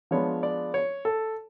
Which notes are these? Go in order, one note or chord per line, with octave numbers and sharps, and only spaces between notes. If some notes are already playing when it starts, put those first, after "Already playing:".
F3 G#3 B3 D4 C#5
D5
C#5
A4